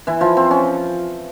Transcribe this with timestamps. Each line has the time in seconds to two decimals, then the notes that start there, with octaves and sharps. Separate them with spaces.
0.07 E3 E4
0.21 F3 F4
0.37 C4
0.51 C#4